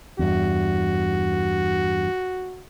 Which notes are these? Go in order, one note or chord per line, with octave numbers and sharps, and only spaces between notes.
E2 G2 F#4